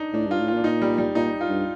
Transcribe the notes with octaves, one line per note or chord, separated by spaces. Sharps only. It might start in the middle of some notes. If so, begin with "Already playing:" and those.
Already playing: D4 D#4
A2 D4
G2 F4
A2
A#2 F4
D4
A#2 D#4
G3
G3
A#2 D#4
F4
G2